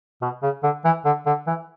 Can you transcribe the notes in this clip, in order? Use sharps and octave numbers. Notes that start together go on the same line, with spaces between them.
B2
C#3
D3
E3
D3
D3
E3